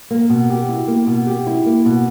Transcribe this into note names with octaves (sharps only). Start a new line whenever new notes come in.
A#3
B2
G4
E4
A#3
B2
G4
E4
A#3
B2